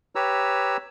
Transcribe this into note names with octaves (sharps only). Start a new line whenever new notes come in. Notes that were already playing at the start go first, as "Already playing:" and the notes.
G4 B4 C#5 A#5 E6